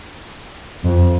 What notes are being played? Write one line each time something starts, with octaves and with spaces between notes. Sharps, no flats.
F2